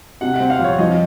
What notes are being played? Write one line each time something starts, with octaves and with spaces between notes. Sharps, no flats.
C3 F#5
C4 F#5
F5
F2 C#5
F3 D#5